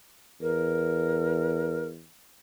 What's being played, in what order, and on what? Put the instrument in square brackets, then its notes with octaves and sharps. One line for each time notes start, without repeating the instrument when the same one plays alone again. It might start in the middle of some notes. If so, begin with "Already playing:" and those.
[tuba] E2 [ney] A#4